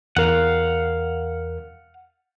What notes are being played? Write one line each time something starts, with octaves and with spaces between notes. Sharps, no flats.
E2 A#4 F5 F#5